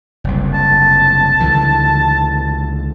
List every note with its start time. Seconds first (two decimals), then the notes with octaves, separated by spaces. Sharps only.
0.24 F#1 C2
0.54 A5
1.40 C#2 D3 E3